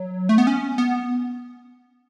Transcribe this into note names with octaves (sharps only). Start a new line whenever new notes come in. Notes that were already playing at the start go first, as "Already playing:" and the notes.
Already playing: F#3
A3
B3
C#4
B3